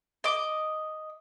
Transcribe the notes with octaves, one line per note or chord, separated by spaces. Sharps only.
D#5 D6